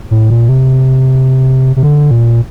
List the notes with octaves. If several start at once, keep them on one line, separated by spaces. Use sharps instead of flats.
A2
A#2
C3
C3
D3
A#2